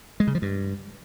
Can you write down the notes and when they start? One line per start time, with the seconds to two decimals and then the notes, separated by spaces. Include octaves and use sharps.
0.20 G#3
0.27 C#3
0.35 F3
0.42 G2